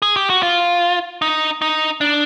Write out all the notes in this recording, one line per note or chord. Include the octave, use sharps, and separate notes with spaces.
G#4
G4
F#4
F4
D#4
D#4
D4